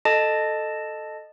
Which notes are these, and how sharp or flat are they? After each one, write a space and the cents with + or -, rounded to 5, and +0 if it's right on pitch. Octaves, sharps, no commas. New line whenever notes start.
A4 +0 D#5 -15 A5 +0